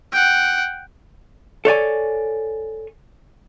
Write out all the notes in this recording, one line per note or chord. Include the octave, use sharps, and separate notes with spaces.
F#5 G5
A4 C#5 D5 G#5